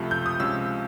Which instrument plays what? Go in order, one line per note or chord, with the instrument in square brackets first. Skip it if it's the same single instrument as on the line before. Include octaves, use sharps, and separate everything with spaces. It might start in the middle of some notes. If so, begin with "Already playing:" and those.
Already playing: [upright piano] C#2 C3 F3 A3
G6
D#6
C#2 C3 F3 G#3 C#4 E6